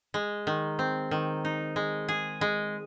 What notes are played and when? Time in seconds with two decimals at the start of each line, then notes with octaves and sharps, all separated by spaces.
0.14 G#3
0.47 D#3
0.79 C4
1.11 D#3
1.45 D#4
1.76 G#3
2.08 G#4
2.41 G#3